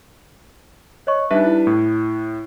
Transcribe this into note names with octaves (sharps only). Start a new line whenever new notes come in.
C#5 D#5 C#6
G3 D4 D#4 B4 E5
E4
A2